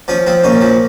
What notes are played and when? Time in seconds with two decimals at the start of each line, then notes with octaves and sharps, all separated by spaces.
0.08 F3 C#4
0.27 F3 C4
0.44 A#2 C#4
0.61 F3